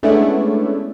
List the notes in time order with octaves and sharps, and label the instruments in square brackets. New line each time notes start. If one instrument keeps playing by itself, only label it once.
[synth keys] G#3 A3 B3 C#4 D4 E4